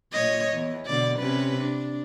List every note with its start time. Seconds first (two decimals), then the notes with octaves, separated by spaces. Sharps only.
0.12 A#2 C#5 D#5
0.54 E2
0.86 B2 D3 D5
1.19 C3 C#4 B4
1.61 D4